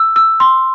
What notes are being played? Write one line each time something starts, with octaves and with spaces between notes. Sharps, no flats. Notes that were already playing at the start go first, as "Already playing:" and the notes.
Already playing: E6
E6
C6